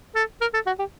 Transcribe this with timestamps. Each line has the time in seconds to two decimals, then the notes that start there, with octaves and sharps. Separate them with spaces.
0.15 A4
0.41 A#4
0.54 A4
0.67 F#4
0.79 G4